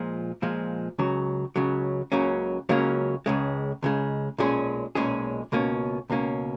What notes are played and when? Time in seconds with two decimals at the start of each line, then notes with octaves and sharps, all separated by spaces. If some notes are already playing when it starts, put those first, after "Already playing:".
Already playing: A#2 F3 G#3
0.42 A#2 F3 G#3
0.99 C#2 C#3 F#3
1.56 C#2 C#3 F#3
2.12 C#2 C#3 F#3 A#3 C#4
2.69 C#2 C#3 F#3 A#3 C#4
3.26 C#2 C#3 G#3
3.83 C#2 C#3 G#3
4.38 B1 A#2 G#3 C#4 G#4
4.95 B1 A#2 G#3 C#4 G#4
5.52 C#2 B2 A#3 C#4
6.10 C#2 B2 A#3 C#4